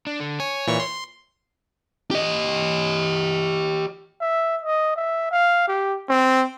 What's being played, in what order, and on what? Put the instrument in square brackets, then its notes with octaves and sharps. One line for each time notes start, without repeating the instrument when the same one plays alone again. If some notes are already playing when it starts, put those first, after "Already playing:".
[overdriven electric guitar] D4
D3
[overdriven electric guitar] C#5 [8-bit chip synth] G#5
[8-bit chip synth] A#2 E3 C#6
C6
[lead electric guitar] G4 D#5
[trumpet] E5
D#5
E5
F5
G4
C4